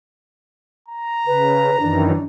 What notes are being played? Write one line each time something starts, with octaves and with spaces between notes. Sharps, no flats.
A#5
C#3 B4
F#2 D#3 E3 D4